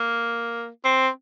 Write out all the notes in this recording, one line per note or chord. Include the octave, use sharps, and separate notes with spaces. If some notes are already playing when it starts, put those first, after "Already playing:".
Already playing: A#3
C4